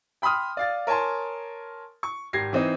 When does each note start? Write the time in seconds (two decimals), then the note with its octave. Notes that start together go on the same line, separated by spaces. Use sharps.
0.22 G5 B5 C6 D#6 F6
0.57 D5 F5 A6
0.87 A#4 C#5 G#5 A5 C6
2.03 C#6
2.33 G#1 G4 G#6 A#6 C7
2.53 E3 C4 D#4